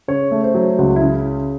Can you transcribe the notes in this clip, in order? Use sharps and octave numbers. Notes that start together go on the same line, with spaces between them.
C#3 C#5
A3
C5
F#3
C#2 F#4
E4
C#3